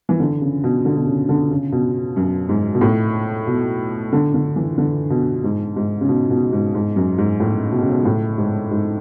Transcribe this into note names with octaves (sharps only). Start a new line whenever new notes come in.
E3
D3
C#3
B2
D3
B2
C#3
D3
C#3
B2
F#2
G#2
B2
A2
B2
D3
D3
E3
D3
B2
G#2
G#2
C#3
B2
B2
G#2
G#2
F#2
G#2
A2
B2
C#3
B2
A2
G#2
G#2